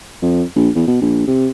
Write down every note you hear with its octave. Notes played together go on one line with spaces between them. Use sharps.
F2
A#1
E2
B2
A#1
C3